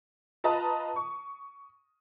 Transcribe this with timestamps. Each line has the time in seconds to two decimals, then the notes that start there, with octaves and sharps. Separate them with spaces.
0.44 F4 B4 D#5 A5 A#5 D#6
0.96 C#6